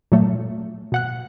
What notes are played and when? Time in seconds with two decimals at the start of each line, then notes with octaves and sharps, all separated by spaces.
0.12 A#2 F#3 A3
0.92 B2 F#5 F#6